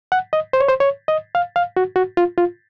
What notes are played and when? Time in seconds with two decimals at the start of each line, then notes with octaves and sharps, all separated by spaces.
0.12 F#5
0.33 D#5
0.53 C5
0.60 C#5
0.68 C5
0.80 C#5
1.08 D#5
1.35 F5
1.56 F5
1.77 F#4
1.96 F#4
2.17 F4
2.38 F4